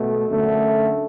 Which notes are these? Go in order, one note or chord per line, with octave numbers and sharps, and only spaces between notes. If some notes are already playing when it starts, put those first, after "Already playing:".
Already playing: B2 A3
F#2 D3 A3